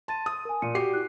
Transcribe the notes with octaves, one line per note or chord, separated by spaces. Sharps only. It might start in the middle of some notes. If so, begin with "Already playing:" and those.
A5 C6 A6 D#7
D#6
A#4 G#5
A#2 C#7 D#7
F#4 G4 C7
E4 F#6